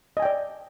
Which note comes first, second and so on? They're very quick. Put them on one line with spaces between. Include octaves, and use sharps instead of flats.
D#5 G#5 G5 D5